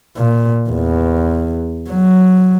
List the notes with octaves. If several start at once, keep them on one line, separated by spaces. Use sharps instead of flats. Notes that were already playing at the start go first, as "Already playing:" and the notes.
A#2
E2
F#3